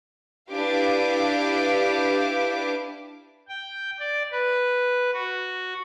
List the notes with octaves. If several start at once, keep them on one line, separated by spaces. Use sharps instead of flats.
D4 E4 G4 B4 F5 D6
G5
D5
B4
F#4